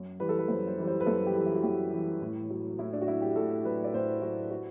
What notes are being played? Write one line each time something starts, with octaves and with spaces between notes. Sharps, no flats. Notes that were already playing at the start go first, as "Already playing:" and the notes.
Already playing: F#2
E3 G3 B4
A4
B4
F#2 C5
C5
E3 G3
C5
B4
F#2 A4
G4
E3 G3 A4
E4
F#4
F#2 G4
E3 G3
A2
F#3
A2 E4
D4
F#4
F#3 E4
G4
A2 A4
F#3 B4
D5
A2 C5
F#3 F#4
F#4